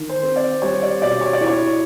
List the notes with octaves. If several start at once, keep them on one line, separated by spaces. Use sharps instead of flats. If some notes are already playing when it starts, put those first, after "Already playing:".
Already playing: D#3
C5
C4
D5
G3 C#5
D5
B2 D5
C#5
D5
E4
C#5